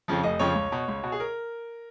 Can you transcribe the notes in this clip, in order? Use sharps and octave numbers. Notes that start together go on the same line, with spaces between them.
F2 C#3 F3
F1 D#5
F2 C#3 F3 C#5
C#2
B2
C#2
B2 F#4
G#4
A#4